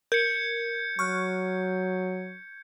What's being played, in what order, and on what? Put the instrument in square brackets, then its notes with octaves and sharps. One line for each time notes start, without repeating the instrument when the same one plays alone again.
[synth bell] A#4 [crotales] G6 G#6 C#7
[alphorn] F#3 [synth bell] C#6 F6 F#6